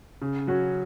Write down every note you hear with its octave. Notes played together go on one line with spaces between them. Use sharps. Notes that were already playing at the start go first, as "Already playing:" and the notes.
C#3
F#3 C#4 F#4